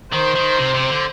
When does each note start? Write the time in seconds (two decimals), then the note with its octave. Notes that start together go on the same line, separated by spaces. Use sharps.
0.12 D#3 C5
0.35 D#3
0.59 C3
0.74 C3
0.90 D3